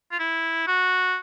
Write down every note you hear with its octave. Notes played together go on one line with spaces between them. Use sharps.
F4
E4
F#4